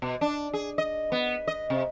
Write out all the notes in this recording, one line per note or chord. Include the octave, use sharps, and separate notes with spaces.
B2
D4
G#4
D#5
B3
D#5
C3